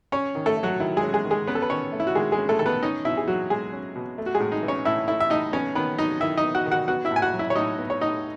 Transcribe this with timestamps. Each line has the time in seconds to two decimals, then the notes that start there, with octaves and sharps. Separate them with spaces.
0.12 C#4 C#5
0.35 D#3
0.46 A3 A4
0.57 A3
0.63 F#3 F#4
0.80 D#3 E4
0.97 G#3 G#4
1.03 C#4
1.13 G#3 G#4
1.25 D#3
1.31 G#3 G#4
1.47 B3 C#4 B4
1.55 A4
1.62 B4
1.70 D#3 C#4 C#5
1.92 A3
2.00 E4
2.07 F#4
2.15 D#3 G#3 G#4
2.32 G#3 G#4
2.38 C#4
2.49 A3 A4
2.59 D#3 A4
2.66 B3 B4
2.83 C#4 D#4 D#5
3.05 B2 E4 E5
3.17 G#4
3.28 F#3 F#4
3.50 B2 G#3 G#4
3.73 C#4
3.96 B2
4.18 A3
4.26 F#4
4.35 G#3 G#4
4.40 A2
4.52 D#4
4.63 E3
4.68 C#4 C#5
4.85 A2 E4 E5
5.08 A3 E4 E5
5.20 E5
5.30 A2 D#4 D#5
5.53 B3 C#4 C#5
5.75 D#3 B3 B4
5.98 F#3 D#4 D#5
6.20 D#3 E4 E5
6.37 D#4 D#5
6.44 B3
6.54 F#4 F#5
6.66 D#3
6.71 F#4 F#5
6.88 B3 F#4 F#5
7.05 E4 E5
7.11 A2
7.16 G#5
7.22 F#4 F#5
7.33 F#3
7.39 E4 E5
7.50 C#5
7.56 A2 D#4 D#5
7.78 B3
7.90 C#5
8.01 A2 D#4 D#5